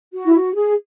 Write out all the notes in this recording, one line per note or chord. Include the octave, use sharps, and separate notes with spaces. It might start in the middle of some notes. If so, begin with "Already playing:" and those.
F#4
E4
F#4
G#4